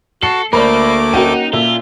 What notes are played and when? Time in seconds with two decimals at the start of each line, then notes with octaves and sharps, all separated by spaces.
0.23 F#4 A4 C7 C#7
0.53 D2 A3 A#3 A#4 C5 D5 B5 D6
1.14 A#3 C#4 D#4 F#4 G5 D#7
1.53 A#2 F4 A4 E5